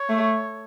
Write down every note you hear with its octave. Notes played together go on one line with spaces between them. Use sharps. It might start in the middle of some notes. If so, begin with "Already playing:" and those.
Already playing: C#5
A3